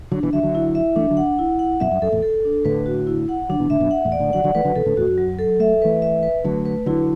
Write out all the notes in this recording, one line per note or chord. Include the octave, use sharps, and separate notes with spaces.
D3 F#3 D4
B2 E3
D3 F#3 E5
D3 F#3
E4
E5
E3 A3 D4
D3 F#3
F#5
E4
F#5
F#2 B2 E5
F#2
F#2 A4
E2 A2
A4
D4
A2 D3 B4
F#4
E4
F#5
D3 F#3 D4
B2 E3
A2 D3 E5
F#2 B2
F#5
E2 A2
D5
A2 D3
A3
D3 F#3 F#5
D3 F#3
E3 A3 B4
D3 F#3
B2 E3 A4
A2 D3
E2 A2 F#4
F#2
F#3
A4
A3 E5
E3 A3 B4
E5
B4
D3 F#3 A3
B4
D3 F#3 E4